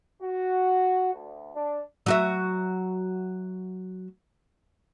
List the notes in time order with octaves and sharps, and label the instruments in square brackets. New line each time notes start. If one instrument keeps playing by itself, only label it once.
[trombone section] F#4
D2
D4
[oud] F#3 F#4 E5